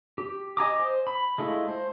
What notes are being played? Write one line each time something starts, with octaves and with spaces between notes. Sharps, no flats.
G4
D#5 G#5 A#5 D6
C5
B5
G#3 A3 E4 F4
C5